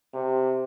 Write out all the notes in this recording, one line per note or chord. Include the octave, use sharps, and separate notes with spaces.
C3